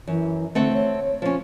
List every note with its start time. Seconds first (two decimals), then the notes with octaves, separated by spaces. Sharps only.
0.07 F#2 E3
0.55 D3 A3 C4 F#5
0.73 C#5
1.22 F3 C#4